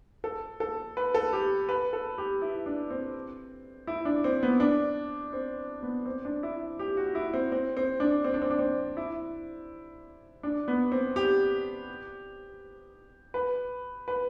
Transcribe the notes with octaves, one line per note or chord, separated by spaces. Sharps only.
A4
A4
B4
A4
G4
B4
A4
G4
E4
D4
C4
E4
D4
C4
B3
D4
C4
B3
C4
D4
E4
G4
F#4
E4
C4
C4
C4
D4
C4
D4
C4
D4
C4
E4
D4
B3
C4
G4
B4
B4